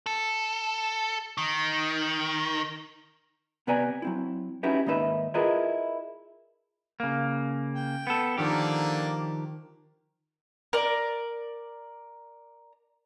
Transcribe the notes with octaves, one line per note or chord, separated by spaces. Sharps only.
A4
D#3
C3 B3 B4 D5 G#5 A#5
F#3 C4 E4
C#4 D#4 E4 F#4 G4 B4
D#2 G#2 A#3 D#4 B4 E5
E4 F4 G#4 A#4 B4 D#5
C#3 A#3
G5
B3 A4
D3 D#3 F3 A#3 D4 G4
A#4 D5